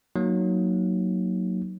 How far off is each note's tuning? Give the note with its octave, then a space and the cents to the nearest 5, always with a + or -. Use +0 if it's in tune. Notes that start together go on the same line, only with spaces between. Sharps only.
F#3 +0 A#3 +0 D#4 +0